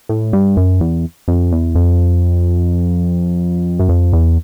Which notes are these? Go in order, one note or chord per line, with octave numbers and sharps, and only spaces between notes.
A2
G2
F#2
E2
F2
E2
F2
F#2
F2
E2